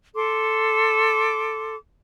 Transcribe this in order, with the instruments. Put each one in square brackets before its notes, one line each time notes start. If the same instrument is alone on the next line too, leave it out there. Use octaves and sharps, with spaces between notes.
[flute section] A4 C6 D6